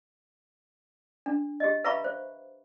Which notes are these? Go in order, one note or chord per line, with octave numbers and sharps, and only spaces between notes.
D4
G4 D#5
B4 E5 F5 A#5 B5 C#6
C5